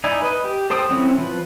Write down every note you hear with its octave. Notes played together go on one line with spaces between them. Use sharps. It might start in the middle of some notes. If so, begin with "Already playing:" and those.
D#4 E4 D5 G#5
B4 D#5
G4
A4 C5 G5 D#6
F#3 C4 C#4 E4
F3 B4